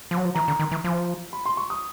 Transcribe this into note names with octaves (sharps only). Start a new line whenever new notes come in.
F3
F#3
F3
E3 A#5
D3
D#3
E3
F3
B5
C6
C#6
D#6